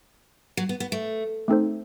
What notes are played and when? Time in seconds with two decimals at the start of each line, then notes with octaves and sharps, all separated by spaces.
0.57 F#3
0.69 B3
0.80 B3
0.92 A3
1.48 A3 C4 D#4 A4 C5